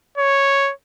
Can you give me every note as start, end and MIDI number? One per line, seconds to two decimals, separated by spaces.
0.17 0.72 73